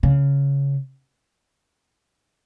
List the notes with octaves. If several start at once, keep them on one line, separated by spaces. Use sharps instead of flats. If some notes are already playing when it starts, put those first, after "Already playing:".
C#3